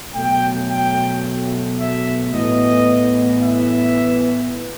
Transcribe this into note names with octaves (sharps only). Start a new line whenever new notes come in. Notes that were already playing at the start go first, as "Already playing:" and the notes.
B2 F#3 A3 G5
G5
E5
A2 E3 B3 D#5
E5